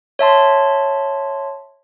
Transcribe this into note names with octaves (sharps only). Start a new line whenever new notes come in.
C#5 E5 A5 C6